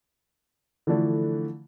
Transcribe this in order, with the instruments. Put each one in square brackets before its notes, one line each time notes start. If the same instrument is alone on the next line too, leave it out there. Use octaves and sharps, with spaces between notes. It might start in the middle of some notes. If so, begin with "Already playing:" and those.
[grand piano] D3 E3 F3 A3 D4 E4